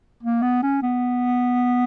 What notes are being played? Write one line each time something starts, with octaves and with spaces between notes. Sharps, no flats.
A#3
B3
C#4
B3